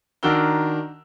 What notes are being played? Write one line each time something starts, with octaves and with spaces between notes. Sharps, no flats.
D#3 D4 F#4 A#4 E6 G7